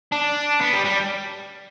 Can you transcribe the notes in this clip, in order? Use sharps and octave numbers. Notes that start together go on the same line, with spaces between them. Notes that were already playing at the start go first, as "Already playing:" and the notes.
D4
B3
G3
G3